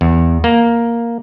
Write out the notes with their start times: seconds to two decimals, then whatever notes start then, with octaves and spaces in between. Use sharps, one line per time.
0.01 E2
0.44 A#3